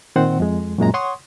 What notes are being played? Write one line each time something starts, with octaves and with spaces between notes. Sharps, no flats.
A#2 D#3 C4 C5 F#5
F2 G#3
F#2 A#2 G#3 A#5
C#5 F#5 C6 C#6 D#6